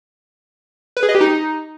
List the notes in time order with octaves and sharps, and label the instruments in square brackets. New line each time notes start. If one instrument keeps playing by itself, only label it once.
[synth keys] B4
G#4
D#5
G4
D#4